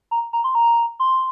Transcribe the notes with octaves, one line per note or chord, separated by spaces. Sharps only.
A#5
A#5
C6
A#5
C6